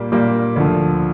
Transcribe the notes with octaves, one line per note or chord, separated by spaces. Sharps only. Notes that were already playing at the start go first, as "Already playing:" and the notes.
Already playing: A#2 G3 A#3
A#2 G3 A#3
D2 D3 F3